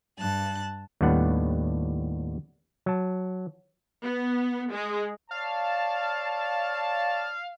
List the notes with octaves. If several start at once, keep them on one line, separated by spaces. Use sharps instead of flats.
G2 A5 F#6
D#2 A2 G3 B3 D4 F#5
F#3 A5
B3
G#3
C#5 D5 F5 A5